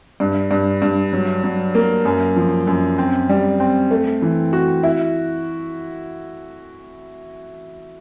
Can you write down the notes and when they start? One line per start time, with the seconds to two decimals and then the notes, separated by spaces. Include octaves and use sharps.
0.20 G2
0.51 G2
0.82 G2
1.13 F#3
1.44 F#3
1.75 A#3
2.05 F#2
2.36 F3
2.67 F#2
2.98 C4
3.29 G3
3.60 C4
3.91 A3
4.22 E3
4.53 F#4
4.83 E4